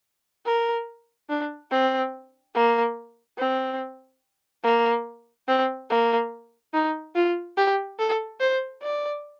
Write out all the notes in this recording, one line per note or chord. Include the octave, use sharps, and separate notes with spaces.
A#4
D4
C4
A#3
C4
A#3
C4
A#3
D#4
F4
G4
A4
C5
D5